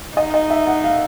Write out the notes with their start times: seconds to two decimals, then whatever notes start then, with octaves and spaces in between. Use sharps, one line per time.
0.17 D#4 D#5
0.34 D#5
0.50 E5
0.67 F#5
0.84 F5